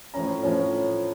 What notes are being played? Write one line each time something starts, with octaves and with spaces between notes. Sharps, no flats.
A2 F3 C#4 A#5
A2 F3 C#4